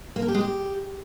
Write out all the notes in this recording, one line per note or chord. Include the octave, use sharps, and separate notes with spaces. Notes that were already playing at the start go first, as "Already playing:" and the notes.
A#3
A#4
G4
G#3
G4